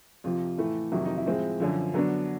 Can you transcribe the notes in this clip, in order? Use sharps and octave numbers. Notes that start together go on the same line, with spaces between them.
F2 C3 F3 F4
A2 E3 A3
F2 C3 D#3 F#3 E4
D#4
E4
A2 F3 G#3 C4
F#2 D3 F3
D3 F#3 B3 D4